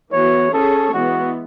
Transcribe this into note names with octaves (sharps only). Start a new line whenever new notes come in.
E3 B3 F#4 C#5
C#4 G#4 A4 C#5
E3 G#3 B3 F#4